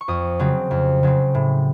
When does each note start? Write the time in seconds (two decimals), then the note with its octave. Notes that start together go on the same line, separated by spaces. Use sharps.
0.01 C#6
0.08 F2 D#6
0.39 C#3 F#3 C4
0.71 F2
1.03 C#3 F#3 C4
1.35 A2